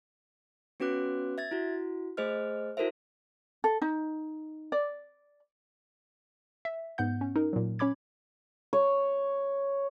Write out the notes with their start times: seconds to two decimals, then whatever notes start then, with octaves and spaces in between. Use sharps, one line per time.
0.80 B3 C#4 F#4 B4 D6 F#6
1.38 E5 G#6 A6
1.51 E4 F#4
2.17 A3 G#4 C5 D#5 F6
2.77 E4 F#4 A4 A#4 C5 E5
3.64 A4
3.82 D#4
4.72 D5
6.65 E5
6.98 G#2 B3 F#5 G6
7.21 C#4
7.36 D#4 A#4
7.53 A#2 F#3
7.79 C#4 C#5 B5 D6 G#6
8.73 C#5